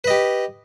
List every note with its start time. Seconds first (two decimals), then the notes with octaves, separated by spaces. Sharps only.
0.04 B4
0.07 D#5
0.10 G4